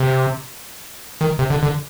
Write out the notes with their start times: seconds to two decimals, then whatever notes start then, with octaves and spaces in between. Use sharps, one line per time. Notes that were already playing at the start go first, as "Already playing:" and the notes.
Already playing: C3
1.21 D#3
1.39 C3
1.50 D3
1.63 D3